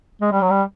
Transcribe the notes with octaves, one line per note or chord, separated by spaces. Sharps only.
G#3
G3
F#3
G3